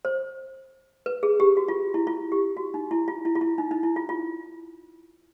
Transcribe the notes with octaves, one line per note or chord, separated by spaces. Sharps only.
C5
B4
G#4
G4
F#4
F4
E4
F4
G4
F#4
D#4
E4
F4
E4
F4
E4
D#4
D#4
E4
F4
F4